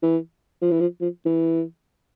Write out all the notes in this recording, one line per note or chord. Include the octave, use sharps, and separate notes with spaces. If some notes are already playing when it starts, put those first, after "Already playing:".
E3
F3
E3
F3
F3
E3